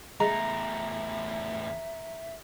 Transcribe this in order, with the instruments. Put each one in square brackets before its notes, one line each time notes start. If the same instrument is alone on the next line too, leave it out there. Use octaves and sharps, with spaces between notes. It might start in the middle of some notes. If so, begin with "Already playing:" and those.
[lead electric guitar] E2 A3 [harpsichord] G#3 [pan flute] E5 [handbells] A#5